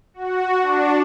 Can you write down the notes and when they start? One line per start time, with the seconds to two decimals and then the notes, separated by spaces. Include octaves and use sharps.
0.14 F#4
0.62 D4